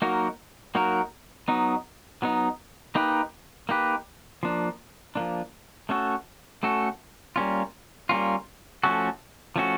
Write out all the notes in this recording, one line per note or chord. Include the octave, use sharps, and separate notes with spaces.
F#3 A#3 D#4 F#4 A#4
F#3 A#3 D#4 F#4 A#4
F#3 B3 D#4
F#3 B3 D#4
A#3 D#4 G4 B4
A#3 D#4 G4 B4
F3 A#3 D4
F3 A#3 D4
A3 C#4 F#4 A4
A3 C#4 F#4 A4
G3 A#3 C#4 F4
G3 A#3 C#4 F4
F3 A3 C#4 F#4 A4
F3 A3 C#4 F#4 A4